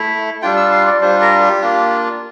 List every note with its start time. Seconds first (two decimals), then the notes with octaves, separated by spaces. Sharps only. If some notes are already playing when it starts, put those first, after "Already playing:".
Already playing: A3 E4
0.42 G3 D4 F4 G5
0.57 E6
0.72 C6
0.86 D5
1.01 G3 D4 F4 C5
1.21 A#4
1.41 G4
1.61 A#3 D4 F4